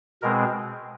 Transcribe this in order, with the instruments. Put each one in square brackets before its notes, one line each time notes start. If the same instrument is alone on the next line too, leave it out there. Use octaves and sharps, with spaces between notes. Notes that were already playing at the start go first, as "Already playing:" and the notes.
[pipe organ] B2 G#3 C4 A#4